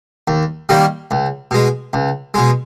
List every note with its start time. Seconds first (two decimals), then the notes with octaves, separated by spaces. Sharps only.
0.28 D#2
0.69 D#3 G3 A#3
1.11 C#2
1.51 B2 G#3
1.93 C#2
2.34 B2 G#3